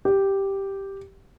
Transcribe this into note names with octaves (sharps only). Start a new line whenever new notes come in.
G4